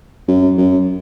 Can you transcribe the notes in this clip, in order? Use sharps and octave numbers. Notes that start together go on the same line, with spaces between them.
F#2
F#2